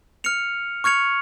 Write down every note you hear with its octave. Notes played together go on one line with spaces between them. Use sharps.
F6 C#7 F7
C#6 F6 G#6 C#7 F7